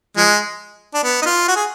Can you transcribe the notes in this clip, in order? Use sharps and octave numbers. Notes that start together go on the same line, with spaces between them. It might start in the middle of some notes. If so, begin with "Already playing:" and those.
F3 G#3
D4
B3
D#4
F4
F#4
G#4